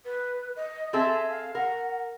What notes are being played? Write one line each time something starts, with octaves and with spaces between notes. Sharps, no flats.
B4
D#5
C4 G#4 A4 E5
F5
A#4 F#5